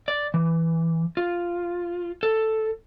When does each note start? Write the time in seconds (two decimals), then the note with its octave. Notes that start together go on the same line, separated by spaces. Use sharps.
0.08 D5
0.34 E3
1.17 F4
2.23 A4